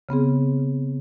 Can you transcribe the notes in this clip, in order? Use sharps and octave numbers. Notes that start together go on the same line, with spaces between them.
C#3 B3 C4 G#4